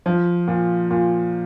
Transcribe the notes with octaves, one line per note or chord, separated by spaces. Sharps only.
F3
A#2
A#2